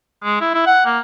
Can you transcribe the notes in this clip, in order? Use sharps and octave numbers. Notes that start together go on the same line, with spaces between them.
G#3
E4
E4
F#5
A#3